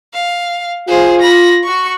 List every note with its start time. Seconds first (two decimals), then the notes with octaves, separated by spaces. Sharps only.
0.14 F5
0.88 F4 G#4 C5
1.21 B5 A#6
1.64 F#4 C#6